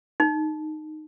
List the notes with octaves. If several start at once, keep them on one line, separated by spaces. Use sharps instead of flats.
D#4